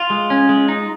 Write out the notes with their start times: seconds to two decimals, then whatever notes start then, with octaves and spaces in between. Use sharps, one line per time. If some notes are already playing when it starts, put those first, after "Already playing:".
Already playing: F4
0.10 G#3
0.30 C#4
0.49 G#3
0.68 D#4